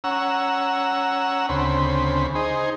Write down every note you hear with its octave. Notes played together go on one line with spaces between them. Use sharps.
C#4 F#5 A#5 E6
D2 C#3 C4 B5
D#4 G#4 C5